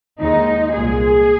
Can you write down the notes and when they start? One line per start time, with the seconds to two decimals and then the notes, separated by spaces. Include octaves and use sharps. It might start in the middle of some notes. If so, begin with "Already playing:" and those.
0.21 D#2 D#3 G#3 D#4
0.74 C2 A#2 G#3 G#4